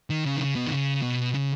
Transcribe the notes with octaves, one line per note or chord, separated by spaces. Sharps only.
D#3
C#3
D#3
C#3
B2
D#3
C#3
B2
C#3